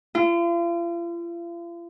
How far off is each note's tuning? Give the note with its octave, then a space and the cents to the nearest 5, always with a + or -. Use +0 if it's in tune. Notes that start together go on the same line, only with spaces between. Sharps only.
F4 -40